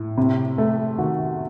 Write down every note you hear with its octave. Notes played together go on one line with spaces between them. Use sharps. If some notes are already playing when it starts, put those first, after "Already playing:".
Already playing: A2
C3
A3
D#3 F#4